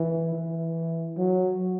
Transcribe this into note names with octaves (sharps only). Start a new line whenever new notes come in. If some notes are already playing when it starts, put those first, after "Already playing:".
Already playing: E3
E3
F#3